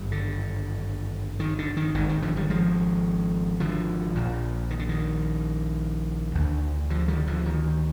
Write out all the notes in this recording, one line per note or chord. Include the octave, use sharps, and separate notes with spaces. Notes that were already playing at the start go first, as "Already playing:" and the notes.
Already playing: G#1 G2
D3
D#3
D3
D#3
G#1 G#2 D#3
D#3
D3 F3
D#3 G3
F3 G#3
D3 F3
A#1 A#2
D#3
D3
D#3
D2 D3
D3 F3
D#3 G3
D3 F3
D#3